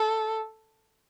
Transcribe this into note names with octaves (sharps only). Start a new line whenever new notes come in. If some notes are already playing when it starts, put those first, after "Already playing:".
Already playing: A4